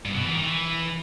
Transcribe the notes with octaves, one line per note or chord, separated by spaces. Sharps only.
G2
B2
E3
D#3
E3